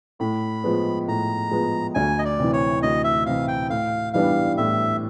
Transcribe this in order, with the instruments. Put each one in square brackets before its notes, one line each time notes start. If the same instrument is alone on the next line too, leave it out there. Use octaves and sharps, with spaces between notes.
[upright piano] A2 [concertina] B5
[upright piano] F3 G#3 B3
[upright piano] A2 [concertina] A#5
[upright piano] F3 G#3 B3
[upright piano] D2 [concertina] G#5
[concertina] D#5
D5
[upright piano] C3 E3
[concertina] C#5
[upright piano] D2 [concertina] D#5
[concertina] E5
[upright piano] C3 E3 [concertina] F5
[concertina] G5
[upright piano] A2 [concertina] F5
[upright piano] E3 G3 B3 D4 [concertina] F5
[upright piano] A2 [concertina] E5